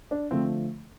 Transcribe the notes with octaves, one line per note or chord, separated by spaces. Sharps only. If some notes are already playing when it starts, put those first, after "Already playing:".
D4
D3 F3 A3 C4